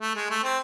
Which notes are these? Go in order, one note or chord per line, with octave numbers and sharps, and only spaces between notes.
A3
G#3
A3
C4